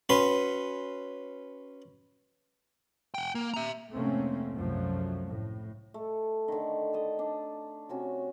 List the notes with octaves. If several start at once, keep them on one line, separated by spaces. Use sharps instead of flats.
C#4 F#4 B4 C6 C#6
F#5 G5
A#3
E5 A#5
F1 G#2 A3 A#3 C4 C#4
C2 F#2 F3 F#3 A3
A2
A3
D3 D#3
A4 D#5
D4
C3 C#4 F#4